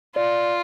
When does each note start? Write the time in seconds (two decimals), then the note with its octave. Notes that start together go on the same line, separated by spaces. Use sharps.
0.16 F4 D5